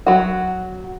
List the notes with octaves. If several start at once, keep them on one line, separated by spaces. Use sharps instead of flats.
F#3 F#4